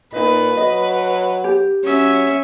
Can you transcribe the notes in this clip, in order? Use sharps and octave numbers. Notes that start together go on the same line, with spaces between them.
A#2 D#4 B4 D#5
F#3 D#5
G4
F#3 C#4 E5